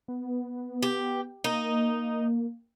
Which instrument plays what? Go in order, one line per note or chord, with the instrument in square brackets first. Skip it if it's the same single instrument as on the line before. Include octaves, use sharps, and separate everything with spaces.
[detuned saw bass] B3
[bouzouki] G4
[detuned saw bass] A#3 [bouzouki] D#4